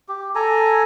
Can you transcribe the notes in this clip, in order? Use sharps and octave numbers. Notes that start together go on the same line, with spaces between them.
G4
A4 G#5 A#5